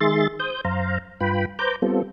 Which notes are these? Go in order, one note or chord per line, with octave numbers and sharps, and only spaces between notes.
D#3 G#3 G#4 E5 C6 A6
C5 D#6 G6
F#2 C5 F5 A#5
G2 F4 B4 G5 B5
B4 C5 A#5 D6 G6
G3 B3 C4 F4 A4